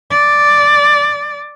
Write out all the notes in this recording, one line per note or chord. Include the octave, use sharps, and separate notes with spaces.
D5